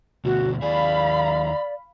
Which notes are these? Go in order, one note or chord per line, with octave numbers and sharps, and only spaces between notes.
D2 B2 F#4
D#2 G#4 D5 F5 B5